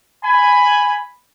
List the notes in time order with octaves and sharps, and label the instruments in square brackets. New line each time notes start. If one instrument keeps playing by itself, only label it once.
[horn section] G#5 B5